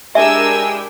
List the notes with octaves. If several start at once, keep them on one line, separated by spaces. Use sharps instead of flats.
G#3 D4 E4 G4 A#4 E5 G#5 E6